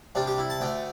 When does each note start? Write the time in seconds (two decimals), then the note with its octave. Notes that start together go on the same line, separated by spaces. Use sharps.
0.15 C2 C3 G3 D4
0.27 G4
0.38 E4
0.50 A5
0.61 D2 D3 A3 G5